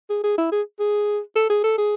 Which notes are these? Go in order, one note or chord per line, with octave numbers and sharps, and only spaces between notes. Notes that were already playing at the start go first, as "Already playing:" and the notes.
G#4
G#4
E4
G#4
G#4
A4
G#4
A4
G#4